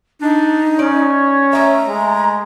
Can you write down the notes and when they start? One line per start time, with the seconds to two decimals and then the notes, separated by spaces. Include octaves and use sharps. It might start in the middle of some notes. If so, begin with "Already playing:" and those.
0.21 D4 D#4
0.79 C#4 C#5 D5
1.53 A3 D#4 E5 A#5
1.89 G#3